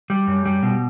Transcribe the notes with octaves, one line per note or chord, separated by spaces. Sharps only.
G3
F#2
G3
B2